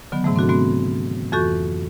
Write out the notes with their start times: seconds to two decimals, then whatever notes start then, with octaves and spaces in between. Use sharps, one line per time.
0.12 D3 D#3 F#3 B3
0.24 G#2 C3 E3 A3
0.36 C4 D4 F#4 A4
0.49 A3 B3 C4 F#4
1.32 F2 E3 F#4 A4 C#6 G6